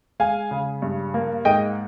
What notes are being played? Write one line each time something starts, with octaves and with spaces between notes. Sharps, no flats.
G#3 F5 G#5
C#3
G2
A#3
G#2 D#5 G5